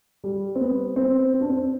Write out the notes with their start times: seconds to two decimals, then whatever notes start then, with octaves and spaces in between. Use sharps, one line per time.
0.24 G3
0.55 C4
0.61 B3
0.96 C4
1.34 C4
1.41 D4
1.50 C4